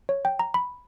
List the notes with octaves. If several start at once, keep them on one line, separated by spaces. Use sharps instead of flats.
C#5
G5
A#5
B5